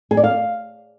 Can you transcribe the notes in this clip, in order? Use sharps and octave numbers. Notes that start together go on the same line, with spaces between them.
G#4
D5
F5